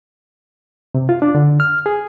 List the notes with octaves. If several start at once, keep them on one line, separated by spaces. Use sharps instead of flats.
C3
F4
D4
D3
F6
G#4